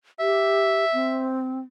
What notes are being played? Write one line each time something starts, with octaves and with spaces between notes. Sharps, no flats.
G4 E5
C4